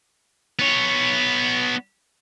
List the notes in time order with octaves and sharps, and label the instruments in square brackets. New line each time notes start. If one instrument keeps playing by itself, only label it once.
[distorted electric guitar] B3 C#5